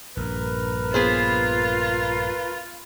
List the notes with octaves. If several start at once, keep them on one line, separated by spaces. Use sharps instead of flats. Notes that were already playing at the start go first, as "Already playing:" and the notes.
A#1 G2 A#4 B4
B3 F4 G#4 C5